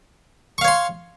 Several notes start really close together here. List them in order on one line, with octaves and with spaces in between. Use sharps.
C#6 F5 C#5 C6